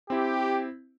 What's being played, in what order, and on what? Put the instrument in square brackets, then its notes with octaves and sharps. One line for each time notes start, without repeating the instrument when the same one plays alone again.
[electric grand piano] C4 E4 [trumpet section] G4